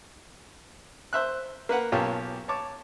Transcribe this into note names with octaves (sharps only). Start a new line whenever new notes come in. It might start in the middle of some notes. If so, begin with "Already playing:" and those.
C5 E5 F#6
A#3 B4 F#5
B1 A#3 C#4 F4 G4 A5
C#5 A5 D6